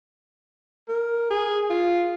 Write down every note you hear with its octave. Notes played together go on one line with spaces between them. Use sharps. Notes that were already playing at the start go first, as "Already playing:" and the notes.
A#4
G#4
F4